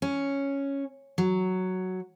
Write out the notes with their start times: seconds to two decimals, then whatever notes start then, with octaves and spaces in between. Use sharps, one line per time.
0.02 C#4
1.18 F#3